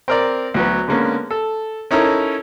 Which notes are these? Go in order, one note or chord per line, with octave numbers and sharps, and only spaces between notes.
C4 A#4 D5
D2 F#3 B3
D3 G#3 A#3 B3 C#4
A4
C#4 D#4 E4 A4 A#4 C#5